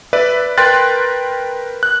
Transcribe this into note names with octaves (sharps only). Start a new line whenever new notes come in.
B4 D5 E5
A#4 B4 G5 C6 F#6 A6
F#6